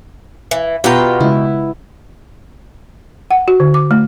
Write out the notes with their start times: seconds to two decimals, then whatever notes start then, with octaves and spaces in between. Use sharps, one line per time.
0.51 E3
0.84 B2 B3 F4 G4 B4 F#5 G5 A#5
1.20 C#3 G#3 E4
3.31 F#5
3.48 F#4
3.60 D3
3.74 D6
3.91 A3